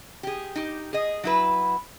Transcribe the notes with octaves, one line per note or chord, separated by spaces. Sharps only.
G4 G#4
D#4 G4
G#4 D#5
F#3 E4 B4